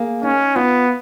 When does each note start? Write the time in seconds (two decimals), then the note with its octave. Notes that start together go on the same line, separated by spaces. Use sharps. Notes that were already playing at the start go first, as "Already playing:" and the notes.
Already playing: A#3 G#4
0.23 C#4 D#4
0.56 B3 F4